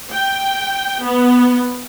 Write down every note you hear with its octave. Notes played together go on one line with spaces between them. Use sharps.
G5
B3